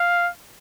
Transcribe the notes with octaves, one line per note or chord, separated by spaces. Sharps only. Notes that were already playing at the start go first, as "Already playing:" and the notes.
Already playing: F5